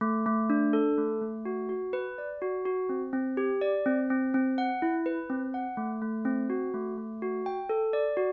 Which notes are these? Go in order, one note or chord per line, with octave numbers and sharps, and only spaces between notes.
A3
A3
D4
A4
A3
A3
F#4
F#4
B4
D5
F#4
F#4
C4
C4
G4
D5
C4
C4
C4
F#5
E4
B4
C4
F#5
A3
A3
C4
F#4
A3
A3
F#4
G5
A4
D5
F#4